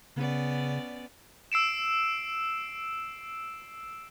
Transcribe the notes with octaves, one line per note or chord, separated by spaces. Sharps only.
C#3 B3 C#4 D5
E6 C7 D7 E7